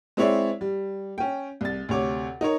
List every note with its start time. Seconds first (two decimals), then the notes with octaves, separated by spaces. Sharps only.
0.17 G#3 C4 E4 C#5 D5 E5
0.61 G3
1.18 C#4 G5
1.61 C2 A6
1.89 D2 C3 C#5 D6
2.41 D#4 A#4 C#5